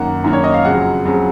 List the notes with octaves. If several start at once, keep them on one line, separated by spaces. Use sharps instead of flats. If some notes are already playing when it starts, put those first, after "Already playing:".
Already playing: F#2 D#3 A#3 F#5
F#2 D#3 A#3
C#5
D#5
F5
F2 C#3 F#3 F#5
F2 C#3 F#3